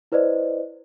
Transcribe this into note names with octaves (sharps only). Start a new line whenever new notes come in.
E4 B4 C5 D5 D#5